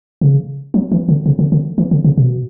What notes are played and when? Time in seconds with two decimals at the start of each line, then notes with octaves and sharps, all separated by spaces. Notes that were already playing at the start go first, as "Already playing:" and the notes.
0.21 C#3
0.74 F#3
0.92 E3
1.09 D3
1.26 C#3
1.39 D3
1.52 D3
1.78 E3
1.91 D3
2.05 C#3
2.18 B2